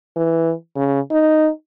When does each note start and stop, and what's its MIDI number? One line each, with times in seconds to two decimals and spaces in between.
0.16 0.53 52
0.76 0.99 49
1.11 1.49 63